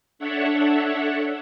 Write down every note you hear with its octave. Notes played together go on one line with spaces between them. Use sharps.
D4 A4 C#5 E5 F#5